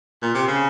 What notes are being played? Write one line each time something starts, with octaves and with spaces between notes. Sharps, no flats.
A#2
C3
C#3